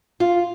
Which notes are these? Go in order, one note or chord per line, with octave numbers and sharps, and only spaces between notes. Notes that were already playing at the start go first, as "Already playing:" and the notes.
F4